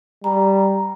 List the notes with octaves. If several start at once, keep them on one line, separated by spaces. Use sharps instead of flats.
G3 A#5